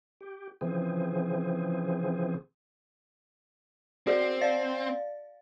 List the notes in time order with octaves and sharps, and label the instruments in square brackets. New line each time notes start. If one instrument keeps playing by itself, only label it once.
[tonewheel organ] G4
C#3 E3 F3 C4 G#4
[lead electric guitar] C4 [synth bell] F#4 G#4 D5
[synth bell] D5 F5 A6